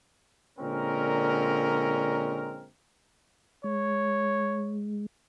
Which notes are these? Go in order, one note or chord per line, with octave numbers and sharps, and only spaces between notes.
A#2 D3 G#3 C4 C#4 A#4
G#3 C#5